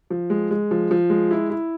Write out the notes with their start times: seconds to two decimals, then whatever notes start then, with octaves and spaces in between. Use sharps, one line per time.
0.10 F3
0.30 G#3
0.51 G#3
0.71 F3
0.91 F3
1.10 G#3
1.31 E4
1.50 E4